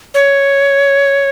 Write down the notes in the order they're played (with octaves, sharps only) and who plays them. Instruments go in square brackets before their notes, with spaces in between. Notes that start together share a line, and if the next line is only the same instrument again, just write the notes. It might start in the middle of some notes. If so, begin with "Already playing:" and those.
[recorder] C#5